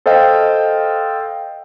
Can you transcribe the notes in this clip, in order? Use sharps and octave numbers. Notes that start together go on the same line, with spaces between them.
A4 C5 D#5 F5 G5